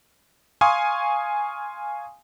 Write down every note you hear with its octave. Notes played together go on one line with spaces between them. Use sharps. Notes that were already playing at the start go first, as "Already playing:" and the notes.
F5 G#5 C6 C#6 D#6